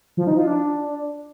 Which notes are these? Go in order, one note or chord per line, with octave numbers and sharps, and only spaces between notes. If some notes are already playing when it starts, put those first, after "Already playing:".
F3
D#4
F4
D4